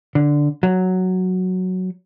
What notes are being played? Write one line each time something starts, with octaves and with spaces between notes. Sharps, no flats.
D3
F#3